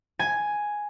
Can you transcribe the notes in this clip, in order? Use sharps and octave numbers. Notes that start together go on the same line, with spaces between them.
G#5